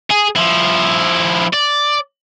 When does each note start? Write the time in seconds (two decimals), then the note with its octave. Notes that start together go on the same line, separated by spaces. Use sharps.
0.10 G#4
0.36 F3 E4
1.53 D5